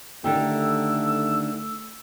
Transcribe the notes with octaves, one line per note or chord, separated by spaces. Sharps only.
D3 D#3 A3 G4 E6